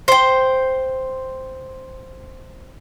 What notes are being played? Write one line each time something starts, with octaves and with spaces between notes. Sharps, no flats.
C5 G5